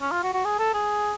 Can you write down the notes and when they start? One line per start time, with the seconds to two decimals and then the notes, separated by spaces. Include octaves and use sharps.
0.01 C#4
0.12 F4
0.23 F#4
0.34 F#4
0.45 G#4
0.59 A4
0.74 G#4